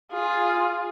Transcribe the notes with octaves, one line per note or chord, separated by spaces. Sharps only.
F4 G#4